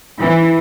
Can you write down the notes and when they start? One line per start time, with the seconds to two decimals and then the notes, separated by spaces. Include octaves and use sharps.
0.19 E3